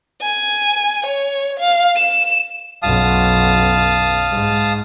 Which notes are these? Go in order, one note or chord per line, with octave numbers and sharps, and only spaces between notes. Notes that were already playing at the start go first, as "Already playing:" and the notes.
G#5
C#5
F5
E7
B1 F#2 F5 A5 D#6
G#2